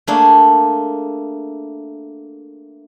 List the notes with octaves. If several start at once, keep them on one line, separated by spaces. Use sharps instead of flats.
A3 A#3 D4 G#4